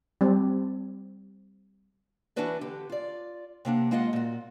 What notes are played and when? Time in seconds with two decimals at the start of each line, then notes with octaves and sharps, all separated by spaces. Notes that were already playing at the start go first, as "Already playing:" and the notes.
0.21 G3 C4
2.36 E3 D4 E4 F#4 B4 D5
2.61 D3 G4
2.89 F4 D5
3.65 C3 A#3 D4 F#5
3.91 G#3 A#3 F4 D#5 F5 F#5
4.13 A#2 F#4